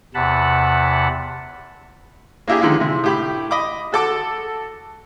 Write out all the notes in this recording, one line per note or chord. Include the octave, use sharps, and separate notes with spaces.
E2 C3 F#5 A5 B5
A#3 D4 E4 G4 G#4
D3 D#3 F3 G#3 E4
C3 E4
A2 G4 B5
D#5 B5 D6
F#4 A4 D6